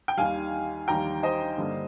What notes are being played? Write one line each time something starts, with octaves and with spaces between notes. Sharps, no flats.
G5
D#2 D#3 G3 F5 G#5
D#2 D#3 G3 G5 A#5
C5 D#5
G2 D3 G3 A#3 D4